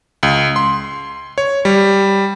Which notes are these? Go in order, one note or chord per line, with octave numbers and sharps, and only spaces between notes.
C#2
C6
C#5
G3